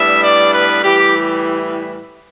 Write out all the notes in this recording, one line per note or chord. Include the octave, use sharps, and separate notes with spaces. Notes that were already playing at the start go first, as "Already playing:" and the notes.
Already playing: A2 G3 B3 D4 E5
D5
B4
A2 E3 G3 G4